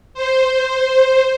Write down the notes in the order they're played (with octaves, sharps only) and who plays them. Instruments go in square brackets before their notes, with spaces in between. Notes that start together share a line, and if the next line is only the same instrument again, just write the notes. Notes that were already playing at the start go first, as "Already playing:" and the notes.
[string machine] C5